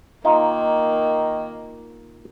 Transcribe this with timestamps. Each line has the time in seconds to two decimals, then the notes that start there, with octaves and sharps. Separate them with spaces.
0.25 D#3 A#3 D#4 F4